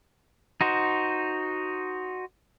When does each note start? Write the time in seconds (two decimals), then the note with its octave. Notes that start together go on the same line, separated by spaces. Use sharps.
0.61 D#4 F#4 C5